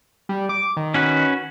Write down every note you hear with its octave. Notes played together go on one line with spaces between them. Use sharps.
G3
D6
D#3
C#4 F#4 B4